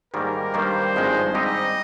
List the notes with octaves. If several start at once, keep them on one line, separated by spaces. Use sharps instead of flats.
G#2 D#3 G3 A#3 A#4
G2 D#3 G3 A#3 C5
G#1 G2 F3 G#3 D#4
G#2 G3 C4 D#4 G4 D#5